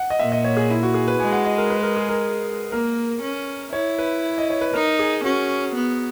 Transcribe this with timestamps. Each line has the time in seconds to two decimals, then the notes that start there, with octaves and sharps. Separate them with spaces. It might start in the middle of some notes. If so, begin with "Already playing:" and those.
Already playing: F#5
0.10 D#5
0.19 A#2 E5
0.32 D#5
0.44 C#5
0.57 G#4
0.70 E4
0.83 F#4
0.94 G#4
1.08 B4
1.20 G#3 G#5
1.33 F#5
1.45 D#5
1.58 A#4
1.70 B4
1.83 A#4
1.96 G#4
2.09 A#4
2.72 A#3 A#4
3.22 C#4
3.73 E4 C#5
3.98 B4
4.38 D#5
4.50 C#5
4.61 B4
4.74 D#4 A#4
4.99 G#4
5.24 C#4 F#4
5.75 B3